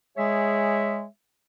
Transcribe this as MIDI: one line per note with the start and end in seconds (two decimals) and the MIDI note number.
0.17 1.05 56
0.17 1.05 68
0.17 1.05 73
0.17 1.05 76